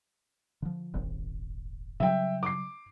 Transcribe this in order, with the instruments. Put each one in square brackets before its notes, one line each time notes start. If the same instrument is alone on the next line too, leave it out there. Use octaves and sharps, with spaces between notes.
[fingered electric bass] D3 F3
D#1 G#1 D#2
[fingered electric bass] C#3 F#3 G3 [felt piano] E5 G5
[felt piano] D6 C7